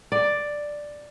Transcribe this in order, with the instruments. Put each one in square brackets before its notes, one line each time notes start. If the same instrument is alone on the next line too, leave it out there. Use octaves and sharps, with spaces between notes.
[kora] D5